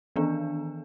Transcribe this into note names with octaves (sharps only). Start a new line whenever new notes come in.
D#3 E3 B3 D4